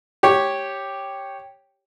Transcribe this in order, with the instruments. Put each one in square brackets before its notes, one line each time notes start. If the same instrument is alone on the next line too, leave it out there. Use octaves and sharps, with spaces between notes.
[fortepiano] G4 C#5